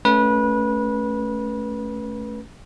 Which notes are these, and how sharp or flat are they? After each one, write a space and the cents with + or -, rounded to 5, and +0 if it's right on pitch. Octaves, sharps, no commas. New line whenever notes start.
A3 -10 C#4 +0 B4 -25